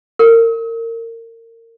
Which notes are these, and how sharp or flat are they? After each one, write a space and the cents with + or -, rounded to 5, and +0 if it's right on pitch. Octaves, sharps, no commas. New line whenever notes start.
A#4 -30